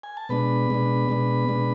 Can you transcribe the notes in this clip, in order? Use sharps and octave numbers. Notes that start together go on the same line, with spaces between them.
G#5
A5
B2 G#3 B3 D4 B4 B5
B2 G#3 B3 D4
B2 G#3 B3 D4
B2 G#3 B3 D4